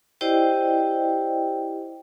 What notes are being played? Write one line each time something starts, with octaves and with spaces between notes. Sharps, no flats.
E4 G4 C5 D5 D#5 G5